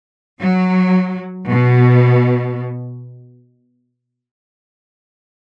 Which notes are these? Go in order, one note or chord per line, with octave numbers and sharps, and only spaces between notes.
F#3
B2